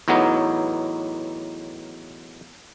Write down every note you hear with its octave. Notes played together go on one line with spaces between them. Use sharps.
E2 A2 F#3 B3 D#4